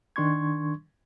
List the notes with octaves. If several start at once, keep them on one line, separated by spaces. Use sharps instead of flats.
D#3 D4 C6 C#6 G#6